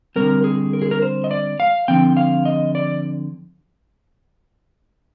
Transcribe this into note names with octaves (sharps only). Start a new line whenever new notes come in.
D3 G3 C4 A#4
G#4
A#4
G#4
A#4
C5
D#5
D5
F5
D3 F3 C4 G5
F5
D#5
D5